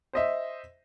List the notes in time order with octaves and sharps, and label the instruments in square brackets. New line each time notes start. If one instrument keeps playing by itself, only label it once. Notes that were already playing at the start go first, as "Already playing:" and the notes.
[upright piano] C5 D#5 E5